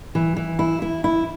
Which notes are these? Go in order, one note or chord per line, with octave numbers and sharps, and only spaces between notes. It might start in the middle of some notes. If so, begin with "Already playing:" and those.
E3
E3
E4
E4
E4